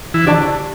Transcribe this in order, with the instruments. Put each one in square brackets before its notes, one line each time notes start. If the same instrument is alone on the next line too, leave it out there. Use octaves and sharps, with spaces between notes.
[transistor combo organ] E3 E4
[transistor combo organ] D3 D4 [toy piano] G4 D5 A5